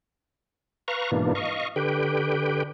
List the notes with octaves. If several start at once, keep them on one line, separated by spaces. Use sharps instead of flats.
B4 F5 A#5 C#6
G#2 B2 E3 A#3 D4
D#5 F5 C#6
D3 G4 B4 G5